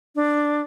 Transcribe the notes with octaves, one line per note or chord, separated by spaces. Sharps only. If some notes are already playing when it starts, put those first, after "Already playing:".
D4